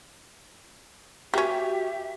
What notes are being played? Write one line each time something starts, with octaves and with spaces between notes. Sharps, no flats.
A#3 C#4 F#4 G4 E5